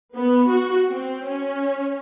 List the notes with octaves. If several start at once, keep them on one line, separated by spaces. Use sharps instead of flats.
B3
F#4
C4
C#4